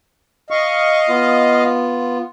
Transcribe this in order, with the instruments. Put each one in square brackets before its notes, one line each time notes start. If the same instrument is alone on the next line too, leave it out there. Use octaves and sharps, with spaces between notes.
[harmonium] D#5 F5 [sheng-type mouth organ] C#6
[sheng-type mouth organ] B3 F4